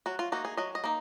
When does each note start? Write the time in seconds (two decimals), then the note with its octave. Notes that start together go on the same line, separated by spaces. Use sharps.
0.06 F#3 F#4
0.19 F4
0.32 A#3 D#4 F#4
0.45 G#4
0.57 F#3 D#5
0.75 D#5
0.84 A#3 D#4